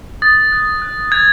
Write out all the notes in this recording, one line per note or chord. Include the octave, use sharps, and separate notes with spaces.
D#6 A6
F#6
F#6
F#6 G#6